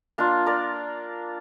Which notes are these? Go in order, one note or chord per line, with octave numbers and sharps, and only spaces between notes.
A#3 D4 F4
A#4 D5